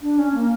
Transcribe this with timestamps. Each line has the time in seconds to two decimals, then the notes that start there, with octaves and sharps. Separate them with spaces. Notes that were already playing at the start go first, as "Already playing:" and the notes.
0.02 D4
0.19 C#4
0.34 A#3